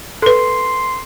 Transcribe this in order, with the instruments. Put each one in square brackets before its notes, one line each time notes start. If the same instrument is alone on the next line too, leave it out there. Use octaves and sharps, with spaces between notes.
[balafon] A4 B4 [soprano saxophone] C6